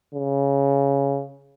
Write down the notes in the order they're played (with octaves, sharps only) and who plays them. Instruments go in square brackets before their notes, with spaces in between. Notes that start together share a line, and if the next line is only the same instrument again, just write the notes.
[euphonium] C#3